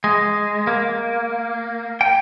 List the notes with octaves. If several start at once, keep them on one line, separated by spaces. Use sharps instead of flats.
G#3
A#3
G5